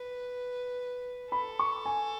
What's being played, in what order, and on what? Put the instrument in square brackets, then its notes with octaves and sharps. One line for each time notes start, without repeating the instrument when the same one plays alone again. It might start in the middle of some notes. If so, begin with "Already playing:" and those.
Already playing: [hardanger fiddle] B4
[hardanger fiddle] A4 [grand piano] B5
[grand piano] C#6
G#5